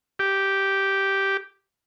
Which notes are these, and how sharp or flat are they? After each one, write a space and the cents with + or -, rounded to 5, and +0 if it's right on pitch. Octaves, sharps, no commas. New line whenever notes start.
G4 -5